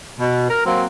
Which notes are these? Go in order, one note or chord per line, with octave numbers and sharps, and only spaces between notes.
B2
A#4
F#3 A#3 C4